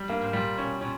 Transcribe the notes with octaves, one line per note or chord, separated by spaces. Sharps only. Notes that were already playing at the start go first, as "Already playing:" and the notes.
Already playing: G3
G2 A#3
G#2
A#2 G3
B2 C#4
A#2 C#4